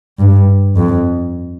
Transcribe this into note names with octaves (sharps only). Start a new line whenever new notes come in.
G2
F2